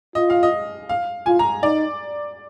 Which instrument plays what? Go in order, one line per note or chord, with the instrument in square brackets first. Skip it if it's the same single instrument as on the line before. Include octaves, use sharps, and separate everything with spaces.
[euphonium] F4 [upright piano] D#5
[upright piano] F5
D#5
F5
[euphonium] F4 [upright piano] G#5
[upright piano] A#5
[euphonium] D#4 [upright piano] D5